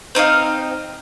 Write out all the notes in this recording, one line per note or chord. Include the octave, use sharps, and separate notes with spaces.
C4 D#4 D#5 F5